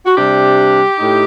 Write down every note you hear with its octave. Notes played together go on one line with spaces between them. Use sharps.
F#4
C3 G3 D4 G4
A2 A3 D#4